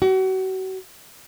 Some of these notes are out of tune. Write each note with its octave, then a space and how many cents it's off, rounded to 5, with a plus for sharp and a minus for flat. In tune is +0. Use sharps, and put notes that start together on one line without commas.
F#4 +35